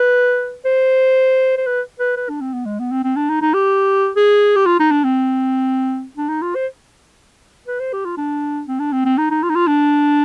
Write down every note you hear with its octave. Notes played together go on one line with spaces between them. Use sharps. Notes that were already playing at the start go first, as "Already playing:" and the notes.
Already playing: B4
C5
C5
B4
B4
B4
D4
C4
B3
G#3
B3
C4
C4
D4
D#4
D#4
G4
G#4
G4
F4
D#4
D4
C4
D4
D#4
F4
C5
B4
C5
G4
F4
D4
C4
D4
C4
C4
D#4
D#4
F4
D#4
F4
D4